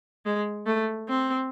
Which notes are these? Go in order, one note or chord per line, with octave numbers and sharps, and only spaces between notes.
G#3
A3
C4